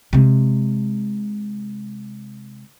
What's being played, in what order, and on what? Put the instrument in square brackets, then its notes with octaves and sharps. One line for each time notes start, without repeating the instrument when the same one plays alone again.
[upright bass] C3 G#3